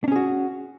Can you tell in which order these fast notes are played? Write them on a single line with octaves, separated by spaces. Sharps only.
D4 C#4 G#4 F#4